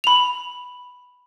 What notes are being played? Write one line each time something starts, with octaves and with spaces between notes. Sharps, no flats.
B5 F7